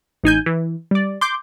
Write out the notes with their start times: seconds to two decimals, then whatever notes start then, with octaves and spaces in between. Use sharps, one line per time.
0.24 A1 D#4 G#5 G6
0.46 E3
0.91 G3 D5
1.21 C6 D6 G6